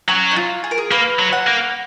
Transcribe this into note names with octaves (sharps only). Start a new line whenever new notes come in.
F#3 C#4
D#4
F4
G#4
A#4
G#4
A#3 B4
F#3
F#5
A#3